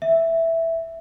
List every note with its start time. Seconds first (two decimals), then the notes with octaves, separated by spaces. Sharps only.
0.02 E5